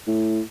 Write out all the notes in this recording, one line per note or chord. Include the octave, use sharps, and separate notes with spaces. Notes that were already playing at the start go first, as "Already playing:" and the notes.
A2